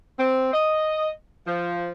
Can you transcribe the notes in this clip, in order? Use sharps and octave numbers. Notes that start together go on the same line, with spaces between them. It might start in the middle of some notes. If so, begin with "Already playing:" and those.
C4
D#5
F3